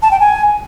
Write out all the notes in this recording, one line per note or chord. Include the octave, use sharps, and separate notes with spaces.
A5
G5
G#5